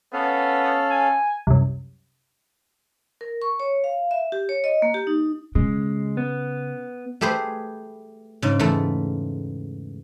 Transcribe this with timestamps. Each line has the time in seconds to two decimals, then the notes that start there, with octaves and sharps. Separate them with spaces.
0.13 B3 C#4 A4 F5
0.91 G#5
1.47 C2 F#2
3.21 A#4
3.42 C#6
3.60 C#5
3.84 F5
4.11 E5
4.32 G4
4.49 C#5
4.64 D#5
4.82 A#3
4.94 G4
5.07 D#4
5.55 C#3 G#3
6.17 B3
7.21 A3 G4 G#4 B4 C5
8.42 G#2 C#3
8.59 E2 G#2 A3